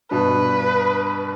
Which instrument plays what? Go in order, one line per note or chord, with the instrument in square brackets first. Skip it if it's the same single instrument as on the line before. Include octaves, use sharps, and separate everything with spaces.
[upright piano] G2 B2 [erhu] B4